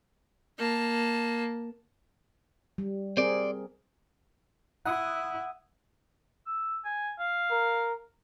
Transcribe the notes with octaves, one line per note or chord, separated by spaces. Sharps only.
A#3 A5
G3
C4 G#4 A#4 C5 D5
E4 F#5 D#6
E6
G#5
F5
A#4